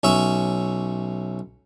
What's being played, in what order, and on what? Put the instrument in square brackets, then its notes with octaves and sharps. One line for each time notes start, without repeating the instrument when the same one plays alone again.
[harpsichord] B1 C#4 E5 C#6